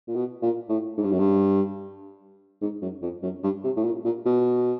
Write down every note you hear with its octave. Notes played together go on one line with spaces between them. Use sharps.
A#2
B2
A#2
A2
G#2
G2
F#2
G2
G#2
F#2
F2
F#2
G2
C3
A2
A#2
A#2
B2